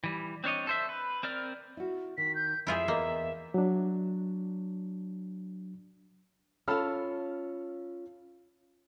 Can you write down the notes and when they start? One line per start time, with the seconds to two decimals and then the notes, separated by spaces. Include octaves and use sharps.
0.04 E3 G3
0.44 C4 D4 C#5 D#5
0.67 A4 C5 E5
0.89 B4
1.23 C4 A#4 D5 F6
1.77 E4 F#4
2.17 D#3 B6
2.35 G6
2.67 F2 E4 F4 G#4 E5
2.88 E2 A#3 D#5 F5
3.54 F#3 D4
6.68 C#4 F4 A4 A5 B5 F6